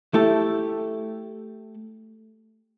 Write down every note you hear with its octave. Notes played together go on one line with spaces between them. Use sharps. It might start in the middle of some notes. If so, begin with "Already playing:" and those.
A3 E4 G4 A4